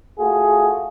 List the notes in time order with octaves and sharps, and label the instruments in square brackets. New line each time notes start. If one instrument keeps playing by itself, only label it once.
[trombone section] A3 F4 F#4 G#4